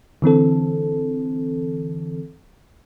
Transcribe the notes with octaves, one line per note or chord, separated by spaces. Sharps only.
D3 E3 C4 A4